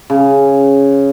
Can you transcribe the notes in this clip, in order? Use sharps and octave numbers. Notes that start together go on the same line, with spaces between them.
C#3